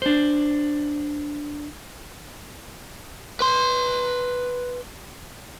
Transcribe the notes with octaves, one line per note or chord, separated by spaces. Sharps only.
D4 C5
B4 C6